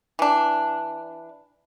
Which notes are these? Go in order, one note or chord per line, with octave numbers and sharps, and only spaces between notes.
E3 D4